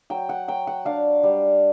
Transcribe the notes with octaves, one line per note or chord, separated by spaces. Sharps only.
F#3 G5
F#5
F#3 G5
F#5
D4 F5
G3